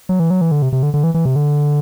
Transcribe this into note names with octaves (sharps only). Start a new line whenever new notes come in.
F#3
E3
F#3
E3
D3
C3
C3
D3
D3
E3
E3
C3
D3